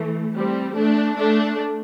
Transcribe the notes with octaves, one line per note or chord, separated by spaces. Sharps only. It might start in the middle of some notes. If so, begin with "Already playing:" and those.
Already playing: E3 A3
G3 C4
A3 D4
A3 D4